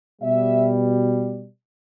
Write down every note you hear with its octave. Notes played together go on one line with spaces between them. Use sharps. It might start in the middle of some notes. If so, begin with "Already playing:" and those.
B2 G3 E5